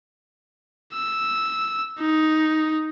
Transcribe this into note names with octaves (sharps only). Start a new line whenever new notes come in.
E6
D#4